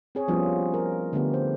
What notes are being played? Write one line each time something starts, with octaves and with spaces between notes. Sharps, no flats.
C4 G#4 C#5
F3 G3 B3 C#4 E4 F4
A#4
D3 A3 B3 G4
C5